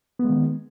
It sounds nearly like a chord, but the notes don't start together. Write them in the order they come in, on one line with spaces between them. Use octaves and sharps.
B3 G#3 D#3